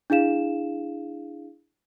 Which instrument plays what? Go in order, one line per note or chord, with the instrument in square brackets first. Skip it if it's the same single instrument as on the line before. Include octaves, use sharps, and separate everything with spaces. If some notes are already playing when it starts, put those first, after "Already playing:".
[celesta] D4 E4 G#4 F5 E7